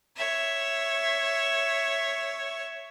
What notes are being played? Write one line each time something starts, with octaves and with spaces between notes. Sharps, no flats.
C#5 E5